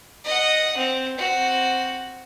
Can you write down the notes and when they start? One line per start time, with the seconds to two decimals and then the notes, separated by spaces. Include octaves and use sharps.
0.25 D#5 F#5
0.78 C4
1.18 C4 F#4